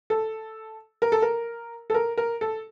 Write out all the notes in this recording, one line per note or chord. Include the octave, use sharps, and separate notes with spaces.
A4
A#4
A4
A#4
A4
A#4
A#4
A4